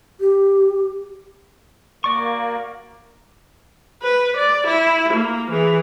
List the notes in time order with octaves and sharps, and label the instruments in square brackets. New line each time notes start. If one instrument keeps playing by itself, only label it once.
[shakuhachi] G4
[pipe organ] A#3 [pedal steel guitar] F#4 D5 C#6
[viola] B4
D5
E4
A#3
E3 G#4